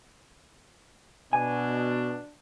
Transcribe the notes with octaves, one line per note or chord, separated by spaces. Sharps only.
B2 D4 G#5